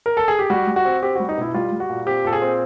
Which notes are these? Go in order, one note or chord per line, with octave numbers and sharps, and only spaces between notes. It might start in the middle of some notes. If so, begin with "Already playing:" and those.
A#4
A4
G#4
G4
G3 F#4
G3
F#4
C4
C4 G4
F#4
G3
D#4
B2 E4
G3 F4
G3
F#4
A#2
C4 G4
A#2 A4
G#4
C4